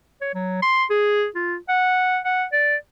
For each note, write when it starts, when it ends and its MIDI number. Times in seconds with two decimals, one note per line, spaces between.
0.21 0.31 73
0.34 0.58 54
0.62 0.84 84
0.90 1.26 68
1.35 1.56 65
1.68 2.20 78
2.25 2.45 78
2.52 2.76 74